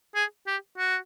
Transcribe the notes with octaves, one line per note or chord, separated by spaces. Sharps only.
G#4
G4
F#4